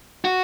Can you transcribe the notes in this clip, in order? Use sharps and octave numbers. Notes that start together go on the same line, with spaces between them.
F#4